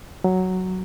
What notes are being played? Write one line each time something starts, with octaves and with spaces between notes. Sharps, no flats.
F#3